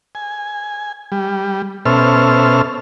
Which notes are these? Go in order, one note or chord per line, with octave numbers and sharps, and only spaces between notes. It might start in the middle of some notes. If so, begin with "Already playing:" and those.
G#5
G3
B2 C#4 A4 C5 E5 F6